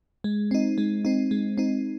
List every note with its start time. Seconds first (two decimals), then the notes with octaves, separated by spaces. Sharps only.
0.24 G#3
0.51 C4 D#4
0.78 G#3
1.05 C4 D#4
1.31 G#3
1.58 C4 D#4